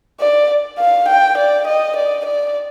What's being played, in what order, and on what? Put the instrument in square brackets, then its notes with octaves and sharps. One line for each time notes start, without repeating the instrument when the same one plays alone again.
[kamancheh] D5
F5
G5
D5
D#5
D5
D5